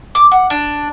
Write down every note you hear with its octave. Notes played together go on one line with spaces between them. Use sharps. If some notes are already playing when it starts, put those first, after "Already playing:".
D6
F#5
D4